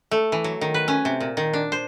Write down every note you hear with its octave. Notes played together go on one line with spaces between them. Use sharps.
A3
E3
F#3
D#3
B4
C#4
C3
A#2
D#3
D4
C5